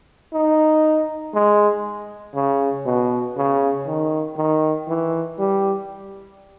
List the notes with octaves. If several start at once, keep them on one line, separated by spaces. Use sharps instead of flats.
D#4
G#3
C#3
B2
C#3
D#3
D#3
E3
G3